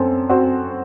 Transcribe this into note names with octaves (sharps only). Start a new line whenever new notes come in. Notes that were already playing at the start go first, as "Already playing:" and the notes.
Already playing: F#2 C4 A4
C4 F#4